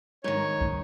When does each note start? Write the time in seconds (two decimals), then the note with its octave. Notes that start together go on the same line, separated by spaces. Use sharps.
0.24 G#2 D#3 C#5
0.61 C#4 D#4